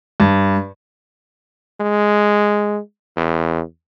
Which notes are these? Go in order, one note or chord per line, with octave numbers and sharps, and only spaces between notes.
G2
G#3
E2